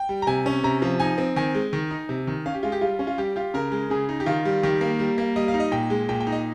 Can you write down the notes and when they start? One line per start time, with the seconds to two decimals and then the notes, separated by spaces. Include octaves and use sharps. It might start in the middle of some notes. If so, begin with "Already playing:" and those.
Already playing: G5
0.09 G3
0.22 A#5
0.27 C3 G#5
0.46 C#4
0.63 C3 A#5
0.82 F3
1.00 D#4 G#5
1.18 C4
1.36 D#3 G#5
1.55 G#3
1.73 D#3
1.91 D#4
2.09 C3
2.27 D#3
2.46 C#4 F5
2.54 G4
2.63 G#3 F4
2.72 G4
2.81 G3 F4
2.99 C#4
3.07 F4
3.18 G3 G4
3.36 F4 G4
3.54 C#3 A#4
3.72 G#3
3.90 C#3 G#4
4.09 D#4
4.20 G4
4.26 D#3 F4
4.45 G3
4.63 D#3 G4
4.81 A#3
4.99 G3
5.18 A#3
5.36 G3 D#5
5.48 F5
5.54 D#4
5.60 D#5
5.71 A#2 G5
5.90 G#3
6.09 A#2 G5
6.20 G5
6.27 D#4
6.32 D#5